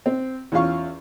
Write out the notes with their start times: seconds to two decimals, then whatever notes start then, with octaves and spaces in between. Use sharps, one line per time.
0.06 C4
0.52 E2 C#4 F4 F5 C#6